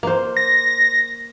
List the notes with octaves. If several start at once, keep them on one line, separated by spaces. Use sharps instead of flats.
A#3 C5
A#6